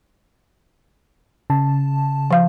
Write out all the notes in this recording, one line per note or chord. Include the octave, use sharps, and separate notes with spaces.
C#3 A5
F3 F5